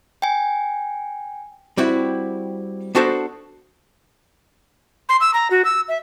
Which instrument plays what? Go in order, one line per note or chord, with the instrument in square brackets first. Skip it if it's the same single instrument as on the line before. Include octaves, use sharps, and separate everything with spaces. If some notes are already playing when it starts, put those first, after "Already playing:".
[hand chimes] G5 G#5
[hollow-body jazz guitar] G3 C4 E4 F#4
B3 D4 F#4 A4 C5
[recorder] C6
E6
A#5
F#4
E6
E5